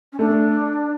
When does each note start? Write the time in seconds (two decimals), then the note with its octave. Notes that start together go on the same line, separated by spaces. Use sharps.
0.13 C#4
0.19 A3 D4